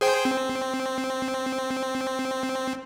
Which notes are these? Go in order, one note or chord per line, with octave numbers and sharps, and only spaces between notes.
G#4 C5 G5
C4